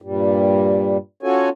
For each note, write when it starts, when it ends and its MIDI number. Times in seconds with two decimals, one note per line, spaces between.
0.02 0.97 43
0.02 0.97 46
0.02 0.97 55
1.23 1.49 61
1.23 1.49 65
1.23 1.49 66
1.23 1.49 69
1.23 1.49 73
1.23 1.49 80